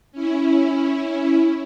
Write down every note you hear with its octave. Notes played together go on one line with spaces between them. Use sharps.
C#4 E4